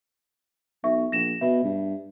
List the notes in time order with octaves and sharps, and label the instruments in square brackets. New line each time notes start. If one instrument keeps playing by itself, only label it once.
[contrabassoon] B1 [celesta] E5 C#6
[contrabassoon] A#1 [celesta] A#6 E7
[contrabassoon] B2 [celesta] E5
[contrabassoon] G2